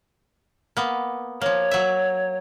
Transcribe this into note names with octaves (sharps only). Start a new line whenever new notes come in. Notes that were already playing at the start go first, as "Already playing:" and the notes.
A#3 B3
F3 A#3 C#5
F#3 E5